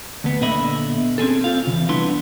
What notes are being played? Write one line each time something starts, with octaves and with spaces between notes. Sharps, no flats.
D2 B3
A#2 D3 B3 D#5 E5 B5
C4 C#4 G#4 A4
C4 F4 F5
E2 C#3
C2 B3 D4 E4 C6